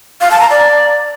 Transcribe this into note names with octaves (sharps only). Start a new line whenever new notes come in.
F5
A5
A#5
D5